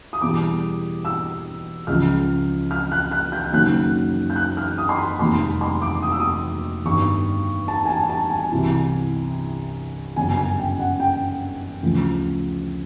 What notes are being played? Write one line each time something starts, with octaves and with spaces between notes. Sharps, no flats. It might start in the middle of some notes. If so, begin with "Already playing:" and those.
D#6
E2 B2 G3 D6
E6
C#2 C#3 F3 F6
F6
F#6
F#6
G6
G6
F#1 F#2 D#3 F#3 F#6
G6
F#6
F6
D#6
C6
B5
F1 D#2 D#3 G3 C6
B5
C6
D6
D#6
E6
D#6
G1 G2 D#3 C#6
A5
G#5
A5
A5
G#5
C2 C3 E3
G1 F#2 C#3 G#5
G#5
G5
F#5
G5
D2 C#3 F3